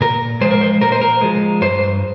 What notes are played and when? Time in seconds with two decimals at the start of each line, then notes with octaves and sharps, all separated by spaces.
0.01 A#2 A#4
0.41 F3 G#3 C5
0.51 A#4
0.61 C5
0.81 A#2 A#4
0.92 C5
1.01 A#4
1.21 F3 G#3
1.62 G2 C5